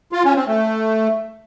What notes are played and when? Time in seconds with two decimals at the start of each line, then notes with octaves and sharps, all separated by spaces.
0.12 F4
0.24 C#4
0.36 C4
0.47 A3